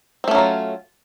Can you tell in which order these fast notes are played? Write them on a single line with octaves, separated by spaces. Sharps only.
C4 A3 C#4 F#3 F4